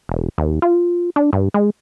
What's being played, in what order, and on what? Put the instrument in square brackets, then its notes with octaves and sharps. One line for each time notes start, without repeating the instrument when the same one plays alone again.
[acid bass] E1
D#2
F4
D4
G2
G#3